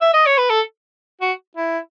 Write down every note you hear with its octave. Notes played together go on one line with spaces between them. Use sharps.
E5
D#5
C#5
B4
A4
F#4
E4